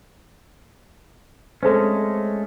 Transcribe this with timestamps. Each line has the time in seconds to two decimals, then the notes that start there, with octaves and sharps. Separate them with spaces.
1.63 G#3 A3 C4 C#4 A4